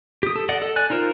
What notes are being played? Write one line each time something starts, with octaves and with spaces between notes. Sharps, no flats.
G4 D#6
A4
D5 D#5 F#5
A4
D5 G#5 F#6
D#4 F4 A#4 C5